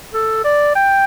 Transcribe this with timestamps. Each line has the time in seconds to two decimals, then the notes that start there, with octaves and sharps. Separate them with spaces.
0.14 A4
0.44 D5
0.76 G5